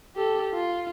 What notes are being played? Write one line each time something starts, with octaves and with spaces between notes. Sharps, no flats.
G4 A4
F4